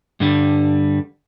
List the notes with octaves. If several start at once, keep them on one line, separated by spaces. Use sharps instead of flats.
G2 D3 G3